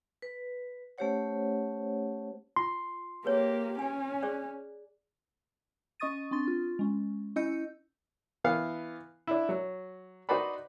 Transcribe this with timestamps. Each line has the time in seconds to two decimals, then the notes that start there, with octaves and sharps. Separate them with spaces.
0.22 B4
0.98 A3 C#4 G4 C5 C#5 F#5
2.56 F4 C6
3.25 A#3 G4 G#4 B4 C#5
3.79 C#4 G#5
4.23 G#4 C5 D5
6.00 C#4 D#5 C#6 D#6 A6 D#7
6.31 C4 D4 C6 A6
6.48 F4
6.79 G#3 C#4
7.36 C#4 E4 D#5 E6 G6 C#7
8.44 E3 B3 F5
9.27 D4 E4
9.49 F#3
10.29 D#4 F#4 B4 C5 D5 B5